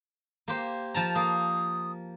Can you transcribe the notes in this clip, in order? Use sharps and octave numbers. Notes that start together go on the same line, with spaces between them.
A#3 G4 C5
F3 A5 A#5
A#3 D#6